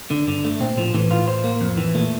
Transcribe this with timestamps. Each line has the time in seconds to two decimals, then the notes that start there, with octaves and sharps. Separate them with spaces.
0.11 D3
0.28 G2 D3
0.45 A3
0.60 A#2 C4
0.77 A2 F3
0.95 A2 E3
1.11 A2 F4
1.28 C5
1.44 A#3
1.61 F2
1.78 E3
1.95 A#2 A3